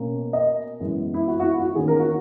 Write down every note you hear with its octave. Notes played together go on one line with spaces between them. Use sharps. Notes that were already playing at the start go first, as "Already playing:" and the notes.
Already playing: B2 A#3 C#4
D#5
F#2 E3 G#3 B3
E4
F#4
F#4
E4
F#4
E2 D#3 A#3 C#4 G#4
A#4
F#4